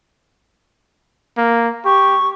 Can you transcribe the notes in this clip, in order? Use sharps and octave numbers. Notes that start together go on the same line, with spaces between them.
A#3
G4 C#6